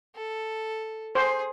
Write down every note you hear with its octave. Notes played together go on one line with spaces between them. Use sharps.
A4
G#4 C5